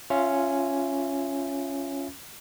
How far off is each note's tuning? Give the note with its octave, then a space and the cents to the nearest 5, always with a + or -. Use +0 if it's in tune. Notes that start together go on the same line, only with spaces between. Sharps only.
C#4 +0 F4 +0 E5 +20